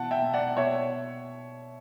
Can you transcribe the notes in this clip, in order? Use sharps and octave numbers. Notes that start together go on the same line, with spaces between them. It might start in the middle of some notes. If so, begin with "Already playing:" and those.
Already playing: B2 E3 F#5 A5
E5 G5
B2
D5 F#5
B2 C#5 E5